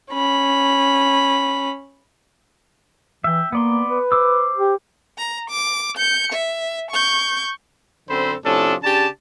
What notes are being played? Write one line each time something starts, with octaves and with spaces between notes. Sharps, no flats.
C#4 B5
E3 E5 G5
A#3 B3 D5 C6
B4
C5 D6 E6
G4
A#5
D6
G6 C#7
E5
C#6 G6
F#2 D3 C4 A4 C5 B5
A2 C3 F3 C#4 D4 A4
C#3 D4 G4 A5